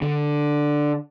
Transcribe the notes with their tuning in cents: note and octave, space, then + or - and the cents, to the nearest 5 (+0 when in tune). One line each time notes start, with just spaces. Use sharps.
D3 +5